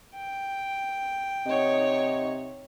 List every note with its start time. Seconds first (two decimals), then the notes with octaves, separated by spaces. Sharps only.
0.14 G5
1.46 C3 D#4 C#5 D#5 F#5